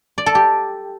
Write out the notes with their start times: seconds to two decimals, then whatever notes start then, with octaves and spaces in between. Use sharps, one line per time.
0.18 D5
0.26 A4
0.35 G4